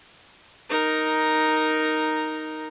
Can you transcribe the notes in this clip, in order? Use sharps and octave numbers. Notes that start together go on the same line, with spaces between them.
D#4 A#4